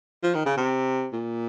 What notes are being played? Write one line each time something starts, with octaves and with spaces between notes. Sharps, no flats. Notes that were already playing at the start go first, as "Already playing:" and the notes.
F3
D#3
C#3
C3
A#2